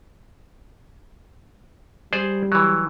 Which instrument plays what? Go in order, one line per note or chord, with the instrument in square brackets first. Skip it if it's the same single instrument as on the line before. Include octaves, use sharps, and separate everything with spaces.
[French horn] G3 [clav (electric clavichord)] G#4 C5 D5
[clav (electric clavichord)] E3 F#3